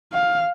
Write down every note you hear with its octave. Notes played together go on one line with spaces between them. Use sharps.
F5